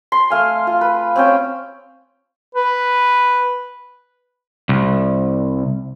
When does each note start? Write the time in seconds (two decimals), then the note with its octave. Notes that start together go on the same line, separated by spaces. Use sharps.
0.12 C6
0.30 A3 F5 G#5
0.67 F4
0.81 B4
1.16 C4 C#4 G5
2.55 B4
4.69 C2